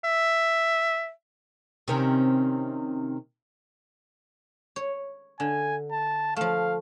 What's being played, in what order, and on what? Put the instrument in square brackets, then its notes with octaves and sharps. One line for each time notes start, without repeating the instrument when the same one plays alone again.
[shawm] E5
[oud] C3 D#3 C#4
[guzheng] C#5
[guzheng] D3 [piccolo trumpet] G#5
[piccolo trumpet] A5
[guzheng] F3 A3 [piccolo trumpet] F5